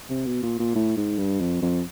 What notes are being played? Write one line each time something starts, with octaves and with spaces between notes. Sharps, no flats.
C3
B2
A#2
A#2
A2
G#2
G2
F2
F2